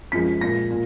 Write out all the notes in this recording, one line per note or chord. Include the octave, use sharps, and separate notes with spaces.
F#2 F3 G#3 B6
A#2 G#3 A#6
A#2